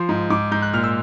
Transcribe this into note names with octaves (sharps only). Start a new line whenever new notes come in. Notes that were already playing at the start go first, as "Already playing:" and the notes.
Already playing: F3 C6
G#2
G#2 D6
G#2 G6
F#6
A#2 F6
E6